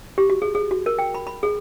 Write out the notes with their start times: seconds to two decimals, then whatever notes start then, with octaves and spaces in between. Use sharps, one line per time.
0.18 G4
0.30 F#4
0.42 G#4
0.55 G#4
0.71 F#4
0.86 A#4
0.99 G5
1.15 B5
1.27 B5
1.43 G#4